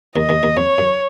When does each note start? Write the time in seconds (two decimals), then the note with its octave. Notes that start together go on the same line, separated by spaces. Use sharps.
0.16 D#2 D#3 D#5
0.29 D#2 D#3
0.43 D#2 D#3
0.57 F2 C#5
0.78 F#2